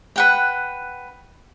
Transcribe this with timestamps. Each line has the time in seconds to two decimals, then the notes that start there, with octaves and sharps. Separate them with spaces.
0.16 B4 F#5 G5